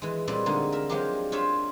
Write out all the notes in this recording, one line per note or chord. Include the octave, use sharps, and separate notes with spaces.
E3 G#3
A#2 G3 G#3 C4 B4 D5
D3 G#3 A#3 D#4
A#4 E5
F3 F#3 G#3 A#3 D4 G4
D4 F4 C5 C#5 E5